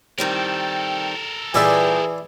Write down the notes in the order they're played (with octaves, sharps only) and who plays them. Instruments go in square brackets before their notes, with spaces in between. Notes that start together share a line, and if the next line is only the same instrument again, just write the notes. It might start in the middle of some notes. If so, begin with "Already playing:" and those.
[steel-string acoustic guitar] D#3 G3 C4 [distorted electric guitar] A4 A#4
[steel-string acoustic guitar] A#2 G3 [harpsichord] E3 D5 E5 [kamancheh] G#4